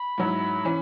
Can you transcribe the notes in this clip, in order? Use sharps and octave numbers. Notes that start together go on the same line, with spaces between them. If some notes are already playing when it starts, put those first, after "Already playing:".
Already playing: B5
G#2 F#3 E4
E3 C#4